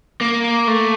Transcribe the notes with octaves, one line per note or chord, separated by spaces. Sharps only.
A#3
A3